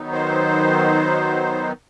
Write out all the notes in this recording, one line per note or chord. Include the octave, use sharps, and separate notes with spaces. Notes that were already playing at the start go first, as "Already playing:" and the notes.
Already playing: D#3 F#3 B3 D#4
C5